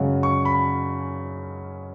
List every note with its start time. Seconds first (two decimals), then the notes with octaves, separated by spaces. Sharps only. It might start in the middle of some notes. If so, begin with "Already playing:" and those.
Already playing: F#2 C#3 G#3 C#4 F#5
0.23 C#6
0.45 B5